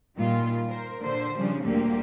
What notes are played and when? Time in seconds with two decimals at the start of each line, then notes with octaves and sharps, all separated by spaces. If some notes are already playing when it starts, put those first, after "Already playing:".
0.17 A#2 D#3 G3 F4
0.68 A#4 C5
1.00 A#2 D3 C5
1.36 C#3 F3 G3 C#4 D4
1.65 D2 A#2 D3 G3 A#3 G4